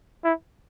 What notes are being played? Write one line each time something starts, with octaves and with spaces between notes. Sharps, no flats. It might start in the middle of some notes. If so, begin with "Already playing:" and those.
E4